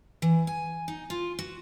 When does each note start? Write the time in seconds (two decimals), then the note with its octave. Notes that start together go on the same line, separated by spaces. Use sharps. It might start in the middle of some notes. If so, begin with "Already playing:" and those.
0.22 E3
0.47 G#5
0.88 D#4
1.10 F4
1.39 F#4